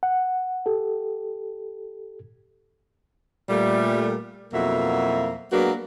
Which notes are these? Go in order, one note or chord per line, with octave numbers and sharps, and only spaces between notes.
F#5
G4 A4
A#2 G3 A3
F2 B2 F#3 A#3 E4 E5
F#3 G#3 A#3 B3 D4 F#4